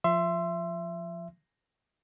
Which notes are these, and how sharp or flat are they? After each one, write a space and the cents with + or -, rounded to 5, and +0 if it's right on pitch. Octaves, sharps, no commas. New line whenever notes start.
F3 +0 E5 +25 C6 +0